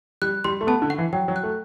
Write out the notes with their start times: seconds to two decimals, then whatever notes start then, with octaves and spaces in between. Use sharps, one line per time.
0.22 G3 F#6
0.44 G3 C6
0.61 A3
0.67 B3 A5
0.82 D3
0.90 F#5
0.98 E3
1.13 F#3 G5
1.28 F#3
1.36 F#6
1.43 A3